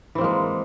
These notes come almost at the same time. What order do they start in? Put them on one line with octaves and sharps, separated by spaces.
E3 C4 A#3 G#3